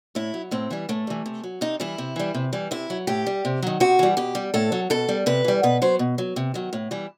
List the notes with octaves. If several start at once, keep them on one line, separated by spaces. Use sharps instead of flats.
A2 E4
F#3
A2 C4
E3 G3
A2 A3
E3 G3
C3
F#3
C3 D#4
E3 G3 E4
C3
E3 G3
C3
E3 G3
C3 E4
F#3
A2 G4
G3
C3
D#3 F#3
C3 F#4
E3 G3
B2 G4
G3
A2 A4
F#3
B2 A4
G3
C3 B4
E3 G3
B2 B4
F#3 C5
B2
F#3
C3
D#3 F#3
A2
E3 G3